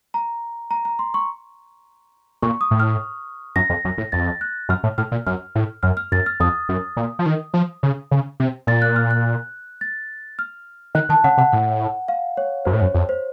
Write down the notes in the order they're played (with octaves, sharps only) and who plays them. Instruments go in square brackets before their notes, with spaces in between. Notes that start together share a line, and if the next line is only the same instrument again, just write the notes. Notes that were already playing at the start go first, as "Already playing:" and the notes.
[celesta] A#5
A#5
A#5
C6
C#6
[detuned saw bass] A#2 [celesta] C#6
[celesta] D#6
[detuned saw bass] A2
[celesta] F6
[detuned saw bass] F#2 [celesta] A#6
[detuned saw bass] F2
F#2
A2
[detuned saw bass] F2 [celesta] A6
[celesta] F#6
[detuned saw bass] F#2 [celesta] F6
[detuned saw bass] A2
[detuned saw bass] A2 [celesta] F6
[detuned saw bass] A#2
[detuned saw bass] F#2 [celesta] F6
[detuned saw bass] A2
[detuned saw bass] F#2 [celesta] F6
[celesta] F6
[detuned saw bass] F#2 [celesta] A6
[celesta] F6
[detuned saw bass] F2 [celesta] D#6
[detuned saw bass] F#2
A#2
F3
D#3
F3
C#3
C#3
C3
[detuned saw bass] A#2 [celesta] A6
[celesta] F#6
F6
F#6
A6
F6
[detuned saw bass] D#3 [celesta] F#6
[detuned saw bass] D#3 [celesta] A5
[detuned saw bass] C#3 [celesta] F#5
[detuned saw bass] C3 [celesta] F#5
[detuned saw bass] A2 [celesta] F#5
[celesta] F5
C#5
[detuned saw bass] F#2 [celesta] C5
[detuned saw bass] A2
[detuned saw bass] F#2 [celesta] C#5
[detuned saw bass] F2
[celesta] C5